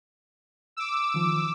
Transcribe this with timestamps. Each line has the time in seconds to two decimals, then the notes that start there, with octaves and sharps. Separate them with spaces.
0.77 D6 E6
1.14 D#3 F3